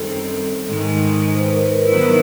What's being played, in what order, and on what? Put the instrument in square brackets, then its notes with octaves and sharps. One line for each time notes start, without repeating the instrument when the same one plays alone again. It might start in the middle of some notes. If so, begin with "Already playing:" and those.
Already playing: [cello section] F#2 D#3 G3 C4 [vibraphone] A4
[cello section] G#2 D#3 G#3
[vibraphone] C5
B4
A#4
B4
[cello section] D#3 F#3 B3 E4